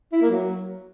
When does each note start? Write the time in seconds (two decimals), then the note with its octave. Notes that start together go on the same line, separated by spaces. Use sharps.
0.13 E4
0.22 A#3
0.31 F#3